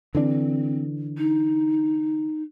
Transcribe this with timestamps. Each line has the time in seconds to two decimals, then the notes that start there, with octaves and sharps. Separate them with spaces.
0.15 D3 E3 C4 D4
1.18 D#4